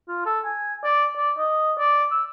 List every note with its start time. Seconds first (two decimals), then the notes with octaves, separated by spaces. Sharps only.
0.08 F4
0.26 A4
0.45 G#5
0.84 D5
1.17 D5
1.37 D#5
1.79 D5
2.11 E6